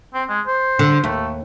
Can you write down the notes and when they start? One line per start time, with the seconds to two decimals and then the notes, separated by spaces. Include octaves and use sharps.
0.14 C4
0.29 G#3
0.47 C5
0.79 D3
1.04 D#2 A3